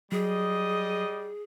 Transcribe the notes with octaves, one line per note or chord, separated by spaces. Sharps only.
F#3 G3 G#4 D#5 D#6